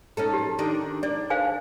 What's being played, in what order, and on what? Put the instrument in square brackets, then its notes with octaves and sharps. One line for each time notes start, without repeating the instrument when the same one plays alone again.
[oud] C#4 D#4 A4
[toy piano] G4
[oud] D#3 D4 D#4
[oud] D4 [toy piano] D5
[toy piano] C5 F5 G#5